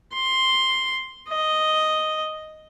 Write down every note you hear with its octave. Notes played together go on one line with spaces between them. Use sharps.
C6
D#5